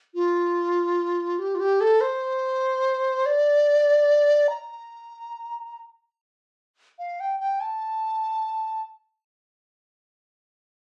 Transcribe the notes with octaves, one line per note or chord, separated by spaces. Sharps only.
F4
G4
F4
G4
A4
C5
D5
A#5
F5
G5
G5
A5